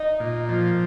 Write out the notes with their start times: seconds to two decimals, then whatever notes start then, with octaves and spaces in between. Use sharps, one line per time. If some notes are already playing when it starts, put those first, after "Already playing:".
Already playing: D#4
0.20 A#2
0.49 F3